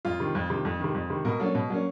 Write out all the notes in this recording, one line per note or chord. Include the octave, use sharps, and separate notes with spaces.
F2 F4
C3 D#3
F2
C3 D#3
F2 A4
C3 D#3
F2
C3 D#3
B2 A#4
F#3 A#3 C#4 A4
B2
F#3 A#3 C#4